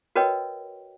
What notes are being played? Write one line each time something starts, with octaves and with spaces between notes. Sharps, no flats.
F#4 A#4 B4 C#5 D#5 G5